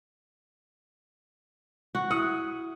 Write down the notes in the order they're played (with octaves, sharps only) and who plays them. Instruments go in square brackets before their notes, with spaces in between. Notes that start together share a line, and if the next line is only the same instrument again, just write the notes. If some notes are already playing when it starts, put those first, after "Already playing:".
[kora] F#4
[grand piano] E4 D#6 [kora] F#5